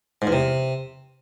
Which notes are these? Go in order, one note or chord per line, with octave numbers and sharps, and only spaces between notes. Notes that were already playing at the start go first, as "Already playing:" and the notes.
G#2
E2
C3